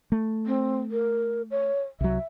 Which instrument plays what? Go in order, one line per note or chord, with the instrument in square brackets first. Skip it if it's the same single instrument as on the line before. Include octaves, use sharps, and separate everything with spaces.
[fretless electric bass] A3
[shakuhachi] C4
A#4
C#5
[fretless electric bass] C2 F#3 [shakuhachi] E5